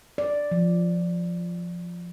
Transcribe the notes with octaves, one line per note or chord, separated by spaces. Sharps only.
D5
F3